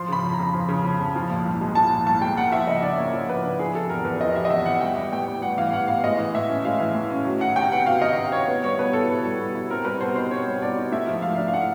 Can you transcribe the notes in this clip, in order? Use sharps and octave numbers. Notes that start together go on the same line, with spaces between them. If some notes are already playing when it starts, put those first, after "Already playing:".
Already playing: F3 C6
C#3 B5
F2
A#5
F2
F3
C#3
F2
F2
F3
A#2
C2
G#3
F3 A5
A#2
C2 A5
G#3 G5
A#3 F#5
F3 E5
C#3 D#5
D4 D5
A#3 C#5
F3
C#3 B4
D4
F3 G#4
C3 A4
E2 A#4
E2 B4
F3 D#5
C3 E5
D#5
E2 E5
E2 F#5
G3 G5
E3
A2 G5
B3
G3 F#5
E3 F5
A2 F#5
B3 F5
G#3 D#5
E3
A2 E5
C#4
G#3 F5
E3
A2
C#4
F#3
D#3 F#5
C3 G5
B3 F#5
F#3 F5
D#3 D#5
C3
B3 C#5
B3
G3 C#5
B2 B4
E4 A4
B3
G3
B2
E4
C4 A#4
G3 B4
B2 C5
D#4 C5
C4 C#5
G3
B2 D5
D#4
A3 E5
F3
G#2 F5
D4
F5
A3 F#5